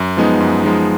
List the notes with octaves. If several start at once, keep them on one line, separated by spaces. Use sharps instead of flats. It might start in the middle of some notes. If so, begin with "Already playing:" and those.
Already playing: F#2
F3 G#3 B3 D#4
F#2
F3 G#3 B3 D#4